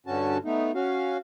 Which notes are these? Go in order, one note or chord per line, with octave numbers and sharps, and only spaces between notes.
G2 D3 C#4 F#4 A5
A3 B3 D#4
C#4 F#4 F5